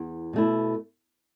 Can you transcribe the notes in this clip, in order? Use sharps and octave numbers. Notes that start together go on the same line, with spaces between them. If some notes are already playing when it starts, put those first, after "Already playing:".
Already playing: E2
B2 A3 E4